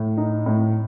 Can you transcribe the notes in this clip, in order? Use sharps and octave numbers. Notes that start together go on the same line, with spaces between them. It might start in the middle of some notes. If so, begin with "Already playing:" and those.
Already playing: A2 A3
D#4
A2